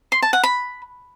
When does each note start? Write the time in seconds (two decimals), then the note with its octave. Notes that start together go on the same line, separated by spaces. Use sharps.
0.12 C6
0.22 A5
0.33 F#5
0.44 B5